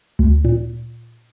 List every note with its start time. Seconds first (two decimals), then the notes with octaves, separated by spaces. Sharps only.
0.19 D2
0.45 A#2